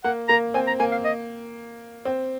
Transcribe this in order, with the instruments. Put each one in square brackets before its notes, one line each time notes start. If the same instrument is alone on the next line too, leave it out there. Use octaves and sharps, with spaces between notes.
[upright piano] A#3 [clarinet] F#5
[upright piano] A#3 [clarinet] A#5
[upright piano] C4 [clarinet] G#5
[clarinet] A#5
[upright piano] A#3 [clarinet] G#5
[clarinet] F5
D#5
[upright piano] C4